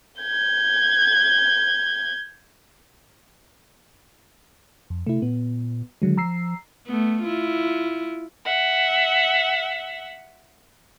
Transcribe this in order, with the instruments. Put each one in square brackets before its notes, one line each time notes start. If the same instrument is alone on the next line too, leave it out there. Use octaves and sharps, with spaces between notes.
[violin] G6 G#6
[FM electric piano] F2
[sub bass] C3 [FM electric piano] A3 E4
[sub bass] A#2 [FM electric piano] B3
[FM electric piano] D3 F#3 G#3 [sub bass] D#3
[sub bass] F3 [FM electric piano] A#5 E6 C7
[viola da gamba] A3 B3
E4 F4
[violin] E5 F#5